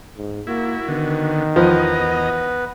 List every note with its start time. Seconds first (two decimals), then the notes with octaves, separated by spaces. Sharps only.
0.17 G#2
0.47 A#3 E4 F#4
0.88 D3 D#3 B3
1.56 E2 F3 B3 B4 D#5 A#5